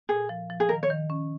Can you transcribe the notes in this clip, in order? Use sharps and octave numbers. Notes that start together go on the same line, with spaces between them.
A#2 G#4
F3
F3
G#4
D#3 A#4
C#5
D#3
C#4